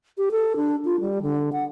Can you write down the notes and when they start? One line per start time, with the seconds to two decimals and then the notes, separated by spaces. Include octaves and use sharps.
0.18 G4
0.31 A4
0.56 D4
0.85 F4
1.00 G3
1.23 D3
1.52 F#5